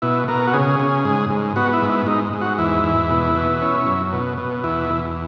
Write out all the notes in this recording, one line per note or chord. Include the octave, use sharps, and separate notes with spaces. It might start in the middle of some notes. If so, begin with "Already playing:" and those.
B2 E4
B2 A#4
F#4
C#3 G#4
C#3
G#2
G#2
B3 F#4
E4
G#2
E4
G#2 D#4
G#2
F#4
E2 E4
E2
B2
B2
C#4
F#2
B2
B2
E2 E4
E2